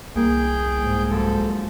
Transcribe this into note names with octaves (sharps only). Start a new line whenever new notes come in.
C2 A#3 G#4 G5
G#2
F#2 F3 A4 G6